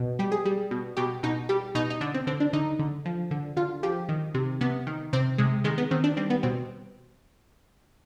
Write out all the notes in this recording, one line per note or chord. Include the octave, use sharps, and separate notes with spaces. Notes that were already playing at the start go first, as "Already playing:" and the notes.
Already playing: B2
G3 G4
G#4
G3
B2
B2 G4
B2 D#4
G3 G4
B2 D#4
D#4
D3 D4
C4
D3 C4
D4
D3 D#4
D3
F3
D3
D3 F4
F3 G4
D#3
C3
C3 B3
D#3
C3 C4
C3 G#3
D#3 G#3
B3
D#3 C4
D4
G3 C4
B3
B2 C4